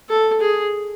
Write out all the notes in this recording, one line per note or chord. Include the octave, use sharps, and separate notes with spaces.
A4
G#4